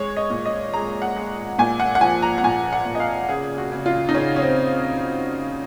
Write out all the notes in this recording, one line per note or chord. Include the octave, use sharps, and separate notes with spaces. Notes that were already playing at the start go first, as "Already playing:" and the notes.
Already playing: G#3 C#5
D#5
A#2
D#5
G#3 A#5
F#5
G#3
A#2 G#5
F#5
F#5
F3 G#5
A#5
F#5
A#2 G#5
F#5
A#2
D#5
F5
C#3 G#4
F#4
C#3
F4
D#4
C#3 C#4
C#4
C4